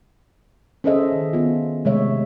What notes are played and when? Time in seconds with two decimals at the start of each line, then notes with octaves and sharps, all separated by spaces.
0.84 C#4 G#4 A4 C5 D#5 E5
1.12 D#3
1.33 B3 F4
1.85 C3 G#3 A3 C#5 E5